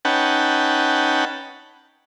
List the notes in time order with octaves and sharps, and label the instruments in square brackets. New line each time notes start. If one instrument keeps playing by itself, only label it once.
[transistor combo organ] C#4 D#4 B4 F#5 G5 A5